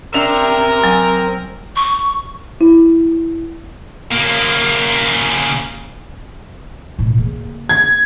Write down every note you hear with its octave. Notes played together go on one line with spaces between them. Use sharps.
C4 D4 A#4 E5 F7
F#3 G#5
C#6
E4
C#3 A#3
B1 A2
C#3 A#3
G#6